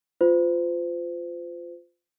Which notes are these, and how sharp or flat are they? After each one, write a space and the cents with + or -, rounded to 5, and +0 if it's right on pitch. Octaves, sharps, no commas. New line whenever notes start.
F4 +0 C5 -35